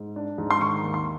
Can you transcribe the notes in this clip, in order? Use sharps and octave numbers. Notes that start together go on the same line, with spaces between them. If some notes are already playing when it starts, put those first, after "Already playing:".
Already playing: G#2
D4
G#2
C6
D#3 C#6
D#2
C6